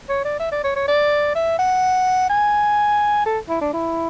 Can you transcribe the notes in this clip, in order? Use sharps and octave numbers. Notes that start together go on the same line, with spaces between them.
C#5
D5
E5
D5
C#5
C#5
D5
E5
F#5
G#5
A4
E4
D4
E4